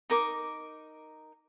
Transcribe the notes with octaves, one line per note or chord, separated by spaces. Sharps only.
D#4 A#4 D6